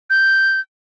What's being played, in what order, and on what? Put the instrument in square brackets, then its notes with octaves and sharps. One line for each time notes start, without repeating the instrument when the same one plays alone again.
[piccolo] G6